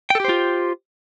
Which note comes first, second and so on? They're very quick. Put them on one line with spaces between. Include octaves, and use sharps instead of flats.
G5 A4 G4 C5 F4